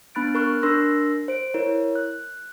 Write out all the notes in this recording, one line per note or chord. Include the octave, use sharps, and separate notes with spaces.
B3 D4 B5 F#6 A6 D7
A#4 B5 C#6 F6 F#6
D4 A#4 C6 E6 A#6
C5 D7
E4 A#4 C#5
F#6